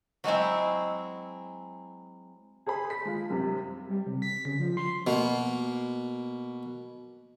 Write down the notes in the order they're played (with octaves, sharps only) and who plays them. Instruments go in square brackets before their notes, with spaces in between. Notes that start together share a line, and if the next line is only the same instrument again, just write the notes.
[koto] F#3 G#3 C4 E4
[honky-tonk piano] G#4 A4 C5 B5
B6
G#3 F4
F#2 C3 G3
[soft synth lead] G3
C3
B6
C#3
F3
C6
[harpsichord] B2 A#3